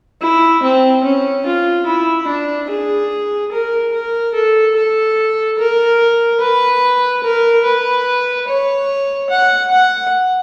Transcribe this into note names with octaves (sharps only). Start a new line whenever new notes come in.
E4
C4
C#4
F4
E4
D4
G#4
A#4
A#4
A4
A4
A#4
B4
A#4
B4
C#5
F#5
F#5